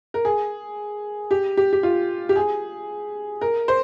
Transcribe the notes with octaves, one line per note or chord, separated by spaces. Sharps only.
A#4
G#4
G4
G4
G4
F4
G4
G#4
A#4
C5